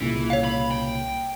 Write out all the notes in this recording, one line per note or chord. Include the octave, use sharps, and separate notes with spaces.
C2 A#2 C#3 E3
C#5 F5
B5
G5